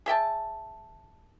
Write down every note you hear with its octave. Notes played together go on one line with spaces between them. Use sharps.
G#4 E5 G5 A5